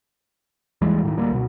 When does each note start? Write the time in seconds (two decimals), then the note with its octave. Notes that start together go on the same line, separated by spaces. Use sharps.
0.81 D#2 E3 G3 G#3
1.03 A2 D3 D#3
1.17 D2 G3 A#3
1.31 C2 B2